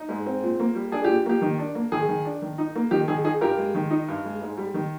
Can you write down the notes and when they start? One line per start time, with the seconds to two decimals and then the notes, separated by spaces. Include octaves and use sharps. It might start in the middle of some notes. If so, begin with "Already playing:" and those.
Already playing: D#4
0.09 G#2
0.26 C4
0.43 A#2
0.60 A#3
0.75 G3
0.92 D4 G#4
1.04 A#2 G4
1.26 A#3 G4
1.42 D#3
1.58 D4
1.75 A#3
1.92 D#3 G#4
2.08 D#3
2.25 D4
2.42 D#3
2.58 D#4
2.75 A#3
2.91 D#3 G4
3.08 D#3 G#4
3.24 D#4 G#4
3.41 G2 G4 A#4
3.58 G#3
3.74 D#3
3.91 D#4
4.08 G2
4.25 G#3
4.41 G#2
4.57 G3
4.74 D#3